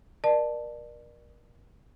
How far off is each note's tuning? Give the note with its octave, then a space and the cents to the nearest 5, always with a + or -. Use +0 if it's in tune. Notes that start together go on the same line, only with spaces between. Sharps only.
A#4 +30 D5 +30 A5 +0